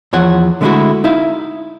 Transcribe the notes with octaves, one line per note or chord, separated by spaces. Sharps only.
E2 F3 C#5 F#5
D3 G#3 A3 C#4 E4 F#4
D#4 E4 E5 F5